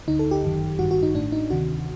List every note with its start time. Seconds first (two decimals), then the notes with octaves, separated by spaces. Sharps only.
0.08 D2 D3 D#4
0.19 A4
0.31 G4
0.43 G1 F#2 D#3
0.79 A1 G2 D#3 F#4
0.91 F#4
1.03 D#4
1.15 A1 A2 D4
1.32 D#4
1.50 D2 C3 D#3 F#4